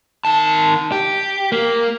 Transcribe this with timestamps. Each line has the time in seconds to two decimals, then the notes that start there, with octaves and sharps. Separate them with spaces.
0.25 D#3 A5
0.92 G4
1.52 A#3